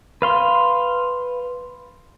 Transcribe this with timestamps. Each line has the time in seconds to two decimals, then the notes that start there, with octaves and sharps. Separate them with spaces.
0.22 B4 F5 C6